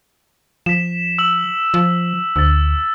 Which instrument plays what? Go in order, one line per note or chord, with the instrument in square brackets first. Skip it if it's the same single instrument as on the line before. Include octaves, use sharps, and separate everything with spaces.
[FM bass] F3 [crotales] B6 E7
[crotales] E6 F#7
[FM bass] F3
[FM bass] D2 [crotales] E6 A6